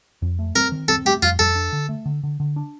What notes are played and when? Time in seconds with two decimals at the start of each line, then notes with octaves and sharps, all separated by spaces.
0.22 F2
0.39 A3
0.55 C4 A#4
0.72 D#3
0.88 C4 A4
1.05 A3 G4
1.22 F2 F4
1.39 F2 A4
1.55 D4
1.73 D3
1.89 A3
2.06 D3
2.23 D3
2.40 D3
2.56 D4